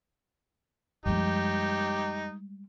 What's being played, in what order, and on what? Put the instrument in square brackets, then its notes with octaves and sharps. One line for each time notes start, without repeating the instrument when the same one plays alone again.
[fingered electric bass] F#2 F3 [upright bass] G3 G#3 [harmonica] D#4 G4